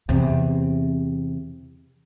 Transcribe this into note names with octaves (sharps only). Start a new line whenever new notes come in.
E2 C3